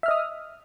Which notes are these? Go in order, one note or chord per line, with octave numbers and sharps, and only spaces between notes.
D#5 E5 D#6 F6